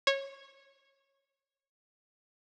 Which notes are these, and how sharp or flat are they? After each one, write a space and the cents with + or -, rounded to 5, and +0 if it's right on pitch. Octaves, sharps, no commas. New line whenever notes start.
C#5 -20